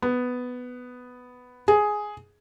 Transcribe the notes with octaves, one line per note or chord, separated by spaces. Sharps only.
B3
G#4